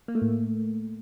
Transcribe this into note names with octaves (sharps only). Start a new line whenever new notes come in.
A#3
A3
A2
A3